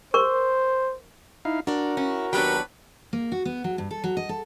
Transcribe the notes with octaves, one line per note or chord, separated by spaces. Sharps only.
A#4 C5 C#6
D#4 E4 F5
D4 F#4 A#4 D5
C#4 E4
D#2 F#3 B3 D4 G4 B4 G5
A#3
F#4
B3
F#3
G2
A4
F#3
D#5
A4